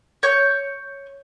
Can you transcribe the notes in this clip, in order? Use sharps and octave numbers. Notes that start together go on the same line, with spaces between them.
C#5 G6